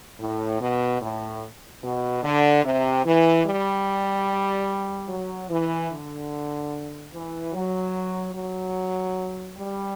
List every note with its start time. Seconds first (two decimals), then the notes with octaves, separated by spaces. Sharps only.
0.19 A2
0.60 B2
1.00 A2
1.82 B2
2.23 D3
2.63 C3
3.04 E3
3.45 G3
5.08 F#3
5.49 E3
5.90 D3
7.12 E3
7.53 F#3
8.34 F#3
9.57 G3